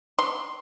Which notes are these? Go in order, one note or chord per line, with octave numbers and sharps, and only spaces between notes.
C6